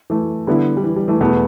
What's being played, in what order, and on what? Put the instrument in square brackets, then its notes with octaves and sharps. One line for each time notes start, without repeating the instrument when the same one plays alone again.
[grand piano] E3 A3
[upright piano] D3 B3 E4 [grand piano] G3
[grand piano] G3
E3
G3
E3 A3
[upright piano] E2 B2 B3 [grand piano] E3 A3